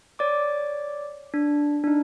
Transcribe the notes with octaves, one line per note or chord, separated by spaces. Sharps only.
C#5 D5 D6
D4
D4 D#4